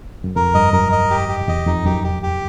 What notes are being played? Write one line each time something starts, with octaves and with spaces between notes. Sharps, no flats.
F#2
F2 A#4
G2 D#5
F#2 A#4
D#5
G4
G4
E2 D#5
F2 D#4
F#2 G4
G4
G4